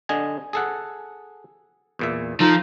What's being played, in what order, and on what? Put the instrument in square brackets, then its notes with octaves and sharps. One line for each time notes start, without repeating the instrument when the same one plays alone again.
[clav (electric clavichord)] D3 D#5 G#5
G#4 A4 F#5
E2 A#2 E5
[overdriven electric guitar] F3 [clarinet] D#4 [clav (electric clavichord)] A4